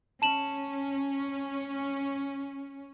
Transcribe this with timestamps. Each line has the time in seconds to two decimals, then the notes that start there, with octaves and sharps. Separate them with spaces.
0.22 C#4 A5 E7 F#7